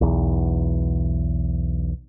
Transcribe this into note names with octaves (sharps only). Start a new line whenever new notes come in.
B1 E2